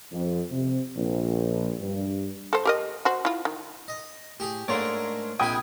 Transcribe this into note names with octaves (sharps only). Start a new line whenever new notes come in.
F2
C3
A#1
G2
A4 C5
G4 A#4 D#5
F#4 C5
E4 F4
D#3
D#5
A2 G4 G#4
G#2 A3 A#3 D4 A#4 C#5 D5 C6
A#1 C3 G#4 D#5 G5 B5 D#6 G#6